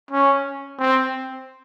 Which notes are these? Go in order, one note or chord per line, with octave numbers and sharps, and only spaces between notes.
C#4
C4